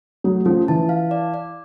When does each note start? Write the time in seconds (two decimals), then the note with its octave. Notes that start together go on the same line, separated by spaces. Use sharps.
0.24 F#3 A3
0.46 F3 C#4
0.68 E3 A5
0.89 F5
1.11 D5
1.34 D5